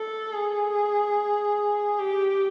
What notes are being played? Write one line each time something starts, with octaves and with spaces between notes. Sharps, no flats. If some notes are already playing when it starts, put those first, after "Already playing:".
Already playing: A4
G#4
G4